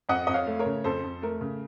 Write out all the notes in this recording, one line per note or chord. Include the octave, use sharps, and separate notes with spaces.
F2 D#5 F#5
F2 D#5
C#5 F5
A3
A#4 C#5
C#3
F2 A4 C5
F2
A3 A#4
C#3